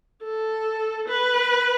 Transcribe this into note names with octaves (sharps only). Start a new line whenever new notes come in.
A4
B4